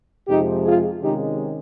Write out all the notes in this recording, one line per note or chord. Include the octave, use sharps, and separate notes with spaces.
F2 C3 F3 G#3 D#4 G4
F4 G#4
C3 D#3 G#3 C#4 D#4 G4